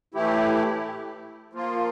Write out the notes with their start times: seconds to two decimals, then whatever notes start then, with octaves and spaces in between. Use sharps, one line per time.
0.14 A2 E3 A3 E4 G4
1.53 F3 A#3 F4